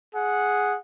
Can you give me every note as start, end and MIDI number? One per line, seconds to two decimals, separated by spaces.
0.14 0.78 68
0.14 0.78 78